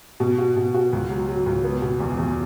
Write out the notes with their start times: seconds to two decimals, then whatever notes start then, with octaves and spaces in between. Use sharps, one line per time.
0.20 B2
0.38 F#4
0.56 B2
0.74 F#4
0.93 C#2
1.10 F#3
1.28 F#3
1.46 C#2
1.64 B3
1.82 B2
2.00 E2
2.18 E2